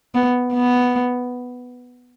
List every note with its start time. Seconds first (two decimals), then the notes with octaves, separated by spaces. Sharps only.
0.15 B3
0.53 B3